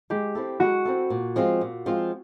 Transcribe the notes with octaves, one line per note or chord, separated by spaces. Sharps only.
G#3 G4
C4 E4 A4
G#3 F#4
C4 E4 A4
A#2
F3 G#3 C4 F4
A#2
F3 G#3 C4 F4